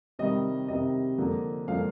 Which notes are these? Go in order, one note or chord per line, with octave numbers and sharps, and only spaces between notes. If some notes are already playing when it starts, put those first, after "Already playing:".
C3 D#3 G3 D#5
C3 D#3 G3 D#5
D3 F3 A#3
D3 F3 A#3 F5